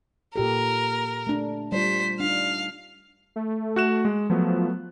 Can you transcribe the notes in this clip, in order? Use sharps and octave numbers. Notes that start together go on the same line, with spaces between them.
A#2 G4 A4 A#4
A3 D4
G3 F4 C5 B6
D4 D#4 F5
A3
F#4 F#6 E7
G#3
F3 F#3 A3 B3